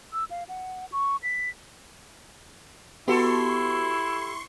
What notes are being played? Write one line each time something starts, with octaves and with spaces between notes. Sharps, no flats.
E6
F5
F#5
C#6
B6
B3 E4 F#4 G4 A4 C6 C#6